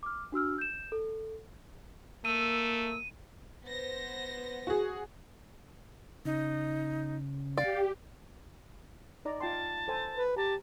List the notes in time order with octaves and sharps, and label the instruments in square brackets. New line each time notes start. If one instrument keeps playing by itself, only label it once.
[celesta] D6 F6
D4 F#4 E6 F6
G6 E7
A4
[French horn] A3 [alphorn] A#3 [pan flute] E6 [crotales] D#7
[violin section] B3 C5 A#6
[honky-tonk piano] F#4 G#4
[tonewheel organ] C#3 [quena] D#4
[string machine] G4 [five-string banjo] D5 [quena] F5
[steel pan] D#4 D5 A#5
[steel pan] F4 G5 C6 [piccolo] A5
[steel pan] A4 C5 G#5
[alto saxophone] B4
[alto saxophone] G4 [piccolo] A5 [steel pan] A#5